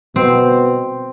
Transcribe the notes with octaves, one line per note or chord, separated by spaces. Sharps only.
B2 C4